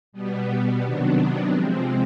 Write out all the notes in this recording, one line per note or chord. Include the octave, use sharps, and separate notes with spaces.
B2 G3 B3
C3 D#3 F#3 B3 D4
C3 F3 G#3 C4